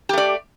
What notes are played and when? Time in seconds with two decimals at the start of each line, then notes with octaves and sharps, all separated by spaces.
0.09 G4
0.13 A3
0.18 D5